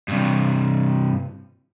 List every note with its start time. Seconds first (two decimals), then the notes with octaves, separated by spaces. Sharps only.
0.08 G2 C3